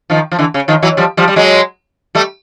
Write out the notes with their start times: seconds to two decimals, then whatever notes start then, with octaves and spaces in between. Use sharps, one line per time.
0.10 D#3 F3
0.32 F3
0.39 D3 E3
0.54 C#3
0.68 D#3 F3
0.82 E3 F#3
0.97 F3 G3
1.17 F3 G3
1.28 G3
1.36 F#3 G#3
2.15 G3 A3